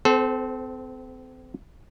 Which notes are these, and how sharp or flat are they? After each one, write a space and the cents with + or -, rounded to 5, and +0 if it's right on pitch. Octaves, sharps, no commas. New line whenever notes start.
C4 -35 A4 -30 C5 +0